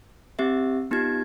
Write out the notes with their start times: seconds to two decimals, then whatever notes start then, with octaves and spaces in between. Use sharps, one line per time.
0.39 C4 G4 E5
0.91 B3 D#4 F4 G4 G#6